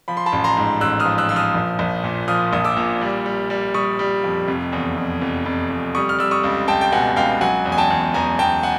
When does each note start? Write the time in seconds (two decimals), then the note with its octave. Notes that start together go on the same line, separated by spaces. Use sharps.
0.08 F3 B5
0.17 C6
0.26 A5 B5
0.32 A1
0.44 A#5 C6
0.57 G#2
0.81 A1 E6 F#6
1.00 D#6 F6
1.05 F3
1.18 E6 F#6
1.29 F3 E6
1.36 D#6 F6
1.55 A#1
1.79 A#1
2.04 A#2
2.28 F3 D#6 F6
2.53 A#1 D#6
2.65 D6 E6
2.77 A#2
3.01 G3
3.26 G3
3.50 G3
3.74 G3 C#6 D#6
3.99 G3
4.24 F2
4.48 F1
4.72 E2
4.97 F1
5.21 F1
5.46 F1
5.70 F1
5.95 G3 C#6 D#6
6.09 F6
6.19 G3 E6
6.31 C#6 D#6
6.44 C#2
6.68 C#2 G5 A5
6.81 G5
6.92 B2 F#5 G#5
7.16 C#2 F5 G5
7.41 F#3 F#5 G#5
7.65 E2
7.72 G#5
7.78 G5 A5
7.90 E2
8.14 E2 G#5 A#5
8.39 E2 G5 A5
8.63 F#5 G#5